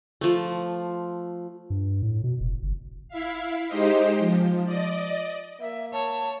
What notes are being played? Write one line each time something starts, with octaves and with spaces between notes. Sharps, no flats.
F3 A3
G2
A2
B2
F1
G1
E4 E5 F5
G#3 D#4 G4 C5 D#5
F3
D5 D#5
A#3 E5
C#5 A5